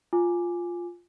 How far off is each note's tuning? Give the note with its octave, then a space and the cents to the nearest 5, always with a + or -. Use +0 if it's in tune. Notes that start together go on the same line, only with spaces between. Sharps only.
F4 +0 G#5 +0 D6 +0